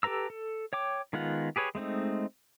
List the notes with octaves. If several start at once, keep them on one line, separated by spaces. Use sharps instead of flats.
G4 A4 B4 A#5 E6
A4
C#5 G5 D6
D#3 G#3 B3 F4 F#5
G4 G#4 B4 C#5
G#3 A3 C4 D#4